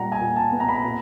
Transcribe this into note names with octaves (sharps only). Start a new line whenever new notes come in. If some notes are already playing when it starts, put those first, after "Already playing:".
Already playing: A#2 G3 F#5 A#5
G#5
A#2
A5
B3
A#5
B5
A#5
A#2